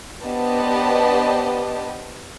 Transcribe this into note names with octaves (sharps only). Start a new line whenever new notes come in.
B3 D4 G4 C5 D#5 A5